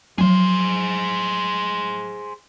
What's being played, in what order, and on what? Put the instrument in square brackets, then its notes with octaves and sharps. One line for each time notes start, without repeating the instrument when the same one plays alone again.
[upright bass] F3 F#3 [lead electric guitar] G#4 C5